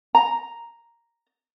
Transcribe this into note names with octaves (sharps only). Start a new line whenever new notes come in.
A#5